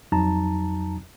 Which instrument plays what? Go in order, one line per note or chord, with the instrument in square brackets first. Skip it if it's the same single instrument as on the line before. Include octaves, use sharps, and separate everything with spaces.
[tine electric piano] F2 F#3 D#4 A5 A#5